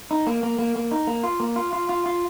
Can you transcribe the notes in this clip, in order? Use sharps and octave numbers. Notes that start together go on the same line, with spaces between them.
D#4
A#3
A#3
A#3
A#3
D#4
A#3
F4
A#3
F4
F4
F4
F4